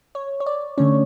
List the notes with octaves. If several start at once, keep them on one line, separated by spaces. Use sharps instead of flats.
C#5
C#5
D5
D3 A3 C#4 C#5